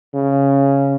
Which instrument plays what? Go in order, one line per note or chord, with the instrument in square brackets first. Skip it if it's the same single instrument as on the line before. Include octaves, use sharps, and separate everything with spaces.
[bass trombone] C#3